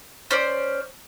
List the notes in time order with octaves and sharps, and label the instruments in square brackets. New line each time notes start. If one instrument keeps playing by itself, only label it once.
[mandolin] C#4 C5 D5